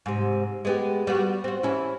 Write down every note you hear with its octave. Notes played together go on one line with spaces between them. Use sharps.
G#2 C3
G#3 B3 G4
G3 B3 F#4
C4 F#4
E3 C#4 E4